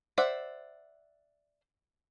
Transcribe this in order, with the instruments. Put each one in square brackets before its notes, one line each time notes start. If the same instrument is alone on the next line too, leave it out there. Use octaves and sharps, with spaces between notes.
[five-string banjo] C5 D5 E5 F#5